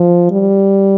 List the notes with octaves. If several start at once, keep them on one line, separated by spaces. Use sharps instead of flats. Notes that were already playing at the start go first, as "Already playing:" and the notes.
Already playing: F3
G3